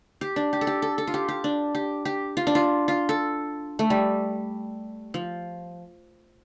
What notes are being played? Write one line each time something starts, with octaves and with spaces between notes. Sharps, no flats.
G4
D4
G4
A4
G4
A4
A4
F4
G4
G4
D4
G4
G4
F4
D4
F4
F4
A4
A3
G3
F3